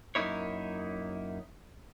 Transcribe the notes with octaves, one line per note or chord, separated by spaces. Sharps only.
F#2 A#3 D#4 E4 C#5